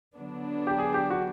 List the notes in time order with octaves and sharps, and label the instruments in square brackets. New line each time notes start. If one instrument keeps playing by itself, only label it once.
[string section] D3 F#3 B3 D4
[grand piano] G4
G#4
G4
F#4